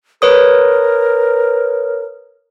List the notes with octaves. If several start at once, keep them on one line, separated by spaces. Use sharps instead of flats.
A#4 B4 C#5 D#6